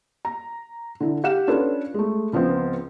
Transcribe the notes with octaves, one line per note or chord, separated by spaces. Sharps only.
A#5
D3 E4
G4 F5 F#5 E7
C#4 D4 F4 A4 B4
G#3 A3
C#2 F3 B3 C4